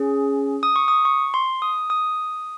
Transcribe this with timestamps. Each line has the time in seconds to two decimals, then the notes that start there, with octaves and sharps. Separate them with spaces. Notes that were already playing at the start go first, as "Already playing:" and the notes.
Already playing: C#4 G#4
0.63 D#6
0.76 C#6
0.88 D#6
1.05 C#6
1.34 C6
1.62 D#6
1.90 D#6